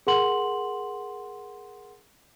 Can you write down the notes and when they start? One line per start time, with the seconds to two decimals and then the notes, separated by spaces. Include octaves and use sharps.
0.07 G#4 A#4 F#5 C6 F#7